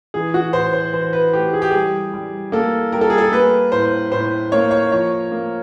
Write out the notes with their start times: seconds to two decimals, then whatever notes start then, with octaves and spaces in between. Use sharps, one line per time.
0.14 E3 G#4
0.34 F#4
0.53 A2 C5
0.73 C5
0.93 E3 C5
1.13 B4
1.33 A3 G4
1.53 G#4
1.62 G4
1.71 G3 G#4
2.14 G3
2.52 A#3 A4
2.92 G3 A#4
3.01 A4
3.10 G#4
3.18 A4
3.32 A#3 B4
3.72 A2 C5
4.12 A2 C5
4.52 A#3 C#5
4.71 C#5
4.92 F3 C#5
5.32 A#3